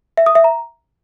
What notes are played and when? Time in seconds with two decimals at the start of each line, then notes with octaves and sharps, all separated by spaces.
0.17 E5
0.26 D#6
0.35 E5
0.44 A#5